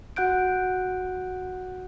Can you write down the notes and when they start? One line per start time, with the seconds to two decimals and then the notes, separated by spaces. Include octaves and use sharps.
0.16 F#4 F#5 F#6 G6 D7